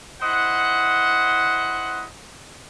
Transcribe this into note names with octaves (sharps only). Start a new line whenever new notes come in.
E4 C5 D#5 F#5